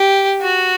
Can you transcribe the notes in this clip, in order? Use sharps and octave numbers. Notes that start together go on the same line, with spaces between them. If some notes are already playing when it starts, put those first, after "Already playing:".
Already playing: G4
F#4